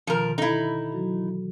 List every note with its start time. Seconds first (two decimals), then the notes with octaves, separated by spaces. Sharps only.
0.07 B2 D3 D#3 F3 A#4
0.38 D#4 E4 A4
0.92 E3 F#3 F#4